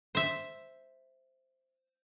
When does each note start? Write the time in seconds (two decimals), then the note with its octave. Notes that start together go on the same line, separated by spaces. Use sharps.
0.15 C5 E5